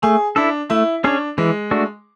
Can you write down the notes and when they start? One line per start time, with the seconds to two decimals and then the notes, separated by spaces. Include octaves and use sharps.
0.03 A3 G#4
0.36 D4 E4 A4
0.70 A3 E4
1.04 C#4 D4 G#4 C#5
1.38 E3 G#3
1.71 A3 D4 F#4